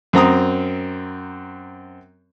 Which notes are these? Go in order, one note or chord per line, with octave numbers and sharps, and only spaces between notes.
F#2 C4 A#5 D#6